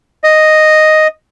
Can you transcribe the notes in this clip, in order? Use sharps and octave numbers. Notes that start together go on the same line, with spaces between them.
D#5